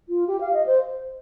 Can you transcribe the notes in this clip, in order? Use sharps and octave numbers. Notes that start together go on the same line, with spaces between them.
F4
G4
F5
D#5
C5